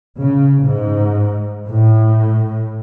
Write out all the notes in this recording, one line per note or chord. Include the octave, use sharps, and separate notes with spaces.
C#3
G#2
A2